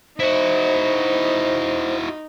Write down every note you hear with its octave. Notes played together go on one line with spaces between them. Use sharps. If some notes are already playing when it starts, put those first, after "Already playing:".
D#4 E4 F#4 C5